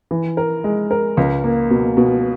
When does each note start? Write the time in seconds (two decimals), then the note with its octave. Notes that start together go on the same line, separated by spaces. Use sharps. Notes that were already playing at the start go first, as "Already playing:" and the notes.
0.11 E3
0.37 A#4
0.64 G#3
0.91 A#4
1.17 C#2
1.44 A#3
1.70 B2
1.97 B2